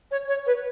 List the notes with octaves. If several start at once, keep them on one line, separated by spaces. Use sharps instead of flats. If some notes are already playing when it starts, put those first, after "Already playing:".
C#5
C#5
B4